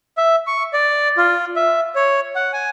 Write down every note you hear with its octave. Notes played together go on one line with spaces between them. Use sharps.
E5
C#6
D5
F4
E5
C#5
F#5
G#5